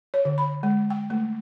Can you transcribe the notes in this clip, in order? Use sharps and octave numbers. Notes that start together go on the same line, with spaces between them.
C#5
D3
B5
G#3
G5
A3